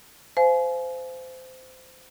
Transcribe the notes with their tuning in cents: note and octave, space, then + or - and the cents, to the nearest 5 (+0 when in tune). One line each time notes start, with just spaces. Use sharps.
C5 -20 F5 -25 G#5 +35